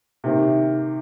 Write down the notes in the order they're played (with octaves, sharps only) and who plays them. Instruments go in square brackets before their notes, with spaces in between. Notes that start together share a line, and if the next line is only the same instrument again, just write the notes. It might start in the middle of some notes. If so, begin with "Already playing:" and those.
[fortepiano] C3 D#3 A#3